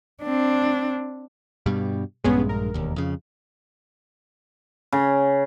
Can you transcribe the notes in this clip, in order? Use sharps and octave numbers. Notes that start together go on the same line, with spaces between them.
C4 D4
G2 B2 G3
A#1 G2 G#3 B3 C#4 G#4
A#4
E1 D#2
F2 C#3
C#3